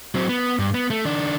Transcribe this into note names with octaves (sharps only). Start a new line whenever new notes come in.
F#3 C4
B3
G2
B3
A3
D#3 D4